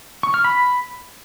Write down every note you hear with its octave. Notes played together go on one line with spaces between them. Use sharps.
C#6
F6
B5